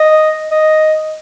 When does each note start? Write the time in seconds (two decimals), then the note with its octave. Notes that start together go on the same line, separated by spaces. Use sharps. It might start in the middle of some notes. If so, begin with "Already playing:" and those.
Already playing: D#5
0.51 D#5